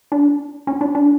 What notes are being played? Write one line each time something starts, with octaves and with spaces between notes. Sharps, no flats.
D4
C#4
D4
D4